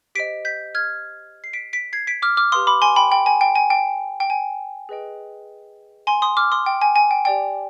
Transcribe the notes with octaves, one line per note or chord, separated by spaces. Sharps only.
G4 C5 D#5 B6 D7
G6 B6
F6 G#6
C7
B6 D7
B6 D7
G#6 C7
B6 D7
D6 F6
D6 F6
G4 B4 F5 C6 D#6
B5 D6
G#5 C6
G5 B5
G5 B5
G#5
G5
G#5
G5
G5
G#5
G#4 B4 D#5 G5
G#5 C6
C6 D#6
D6 F6
C6 D#6
G5
G#5
G#5
G5
G4 D5 G5